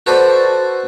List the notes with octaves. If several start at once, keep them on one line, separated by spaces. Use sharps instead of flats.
F#4 A4 B4 C5 D5